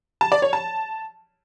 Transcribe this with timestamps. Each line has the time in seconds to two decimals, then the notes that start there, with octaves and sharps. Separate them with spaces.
0.21 A5
0.32 D5
0.42 C#5
0.53 A5